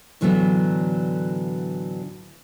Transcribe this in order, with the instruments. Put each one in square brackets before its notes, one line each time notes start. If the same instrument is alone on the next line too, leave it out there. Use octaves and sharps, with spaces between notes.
[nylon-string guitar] A2 D3 E3 F#3 A3 B3